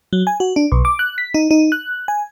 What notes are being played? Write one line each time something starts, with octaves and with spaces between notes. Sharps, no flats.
F#3
G#5
F#4
D4
B1
D6
F#6
B6
D#4
D#4
F#6
G#5